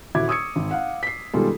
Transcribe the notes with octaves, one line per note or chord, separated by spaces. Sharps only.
D#1 E4 F#4 D6 G#6
C#6 D#6 E6 G#6 C#7
G#1
F5 F#5
B6 C7
B2 D#3 G3 G#3 F4 A4